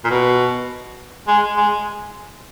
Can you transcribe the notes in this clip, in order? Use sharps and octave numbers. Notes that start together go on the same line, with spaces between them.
A#2
B2
G#3
G#3